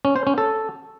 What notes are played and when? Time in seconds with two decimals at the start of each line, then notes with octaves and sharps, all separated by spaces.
0.05 C#4
0.16 C5
0.27 C#4
0.38 A4